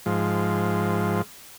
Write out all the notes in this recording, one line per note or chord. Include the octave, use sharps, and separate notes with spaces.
G#2 F3